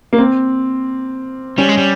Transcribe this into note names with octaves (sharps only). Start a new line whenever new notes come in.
A#3
C4
G3 C#4
G#3
G3